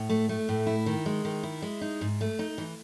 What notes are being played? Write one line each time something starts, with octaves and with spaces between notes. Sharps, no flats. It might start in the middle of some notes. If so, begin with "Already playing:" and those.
Already playing: A2
A3
A3
A2
E4
D#3
G#3
D#3
E4
G#3
D#4
G#2
A3
D#4
E3